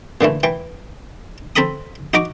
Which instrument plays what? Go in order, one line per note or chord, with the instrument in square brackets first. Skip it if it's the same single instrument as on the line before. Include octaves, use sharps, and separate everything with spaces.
[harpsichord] A#2 D3 E3 A3
E3 G5
C4 A4 A#5 B5 D#6
D#4 F#4 A#5 D6